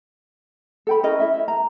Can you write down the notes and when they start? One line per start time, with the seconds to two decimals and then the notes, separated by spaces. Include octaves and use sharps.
0.87 A4 G5 B5
1.03 C#4 E4 A#4 D#5
1.20 E4 E5
1.34 E5
1.48 A#5